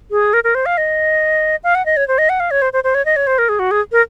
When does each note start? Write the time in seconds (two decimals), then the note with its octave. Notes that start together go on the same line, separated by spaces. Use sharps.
0.11 G#4
0.33 A#4
0.44 A#4
0.55 C5
0.66 F5
0.78 D#5
1.64 F5
1.75 F#5
1.86 D#5
1.97 C#5
2.08 C5
2.18 D#5
2.29 F#5
2.40 F5
2.51 C#5
2.62 C5
2.73 C5
2.84 C5
2.95 C#5
3.05 D#5
3.16 C#5
3.27 C5
3.38 A#4
3.49 G#4
3.59 F#4
3.71 G#4
3.92 A#4